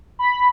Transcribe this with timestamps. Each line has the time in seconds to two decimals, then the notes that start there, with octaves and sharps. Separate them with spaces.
0.19 B5